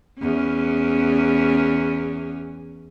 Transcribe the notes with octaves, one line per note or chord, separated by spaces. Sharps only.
E2 C#4